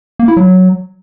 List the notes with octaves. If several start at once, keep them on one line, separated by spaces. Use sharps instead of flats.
A#3
E4
F#3